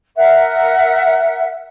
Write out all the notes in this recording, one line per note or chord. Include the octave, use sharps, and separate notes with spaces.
A#4 E5 F#5